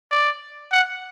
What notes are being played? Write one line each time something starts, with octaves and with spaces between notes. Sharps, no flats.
D5
F#5